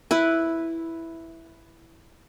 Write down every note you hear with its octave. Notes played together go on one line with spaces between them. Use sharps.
E4 B4